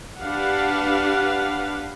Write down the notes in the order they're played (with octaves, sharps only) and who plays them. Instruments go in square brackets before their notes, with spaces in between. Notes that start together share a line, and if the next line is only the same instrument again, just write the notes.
[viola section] D4 G4 B4 F5 F#5